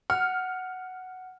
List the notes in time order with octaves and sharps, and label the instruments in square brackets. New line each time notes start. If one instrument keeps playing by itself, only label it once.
[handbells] F#5 [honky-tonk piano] F6